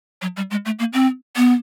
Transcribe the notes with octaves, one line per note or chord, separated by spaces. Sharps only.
F#3
G3
G#3
A3
A#3
C4
B3